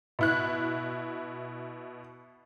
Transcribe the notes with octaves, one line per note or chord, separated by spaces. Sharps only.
B2 E4 F#6